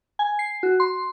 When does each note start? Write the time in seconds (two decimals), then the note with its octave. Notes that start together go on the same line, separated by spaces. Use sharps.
0.19 G#5
0.39 C7
0.63 F#4
0.80 C6